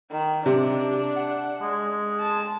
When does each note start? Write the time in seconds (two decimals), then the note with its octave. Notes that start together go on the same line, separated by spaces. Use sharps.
0.11 D#3
0.46 C3 D4
1.16 F#5
1.62 G#3
2.20 A5